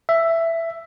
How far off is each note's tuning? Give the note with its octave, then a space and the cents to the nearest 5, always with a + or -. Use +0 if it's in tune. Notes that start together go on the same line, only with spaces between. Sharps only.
E5 +10